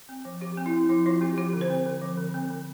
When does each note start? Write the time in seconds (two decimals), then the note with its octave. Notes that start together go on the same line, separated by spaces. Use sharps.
0.09 C4
0.25 F3
0.41 F3 G4
0.57 C4
0.66 E4
0.74 C4
0.89 F3 E4
1.05 F3 F4
1.21 C4 G4
1.37 F3 G4
1.53 D3
1.61 C5
1.70 C4
1.86 D3
2.02 F3
2.18 D3
2.34 C4
2.50 D3